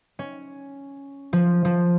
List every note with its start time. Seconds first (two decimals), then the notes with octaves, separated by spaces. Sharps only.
0.19 C#4
1.33 F3
1.65 F3